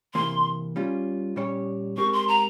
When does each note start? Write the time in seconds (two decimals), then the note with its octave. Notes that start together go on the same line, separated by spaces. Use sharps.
0.14 C3 E3 A#3 C6
0.76 G3 C#4 F4
1.36 A#2 G3 C#4 G4 C#5
1.97 G#3 C4 G4 A#4 C#6
2.13 C6
2.28 A#5